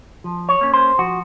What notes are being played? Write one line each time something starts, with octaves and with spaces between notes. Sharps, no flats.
F3
C#5
A#3 C#4
C5
F3 F#4